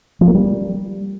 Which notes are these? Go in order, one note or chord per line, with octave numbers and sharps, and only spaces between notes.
F3
A#3
G3